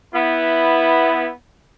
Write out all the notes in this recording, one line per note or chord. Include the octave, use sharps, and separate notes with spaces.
B3 E4